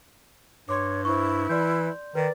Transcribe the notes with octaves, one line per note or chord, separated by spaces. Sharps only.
G2 C#5 C6 D6
E4 C5 C#6
E3 D5 C6 G6
D#3 B4 D5